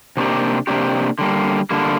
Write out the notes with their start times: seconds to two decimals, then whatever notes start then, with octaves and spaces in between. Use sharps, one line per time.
0.17 C3 A#3 D4 G4
0.67 C3 A#3 D4 G4
1.19 D3 G3 A#3
1.71 D3 G3 A#3